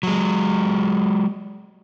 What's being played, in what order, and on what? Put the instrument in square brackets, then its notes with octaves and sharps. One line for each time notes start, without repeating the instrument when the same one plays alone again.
[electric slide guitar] F#3 G#3